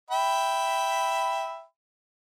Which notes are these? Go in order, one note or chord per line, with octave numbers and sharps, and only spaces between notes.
E5 G5 B5